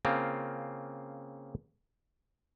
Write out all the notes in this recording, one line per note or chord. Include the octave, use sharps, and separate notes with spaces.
C#3 A#3 C4 F4